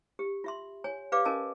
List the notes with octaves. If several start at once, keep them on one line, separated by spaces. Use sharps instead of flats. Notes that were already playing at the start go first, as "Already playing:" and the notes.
G4
F4 E5 C6
C#5 G#5
G4 B4 D5 F5 D6
C#4 A#4 D#5 G#5 A5